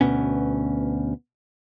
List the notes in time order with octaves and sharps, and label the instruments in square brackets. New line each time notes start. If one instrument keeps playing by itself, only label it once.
[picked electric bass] D2 B2 B3 C#4